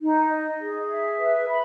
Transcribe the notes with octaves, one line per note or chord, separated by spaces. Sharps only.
D#4
D#5
G#4
E5
B4
B5